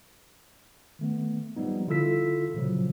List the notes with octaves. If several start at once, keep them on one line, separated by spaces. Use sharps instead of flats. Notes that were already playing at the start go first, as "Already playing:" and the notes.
D#3 A3 B3
F3 G3 B3 D#4
D3 E4 F4 A4 E6 B6
A#2 C#3 F3 F#3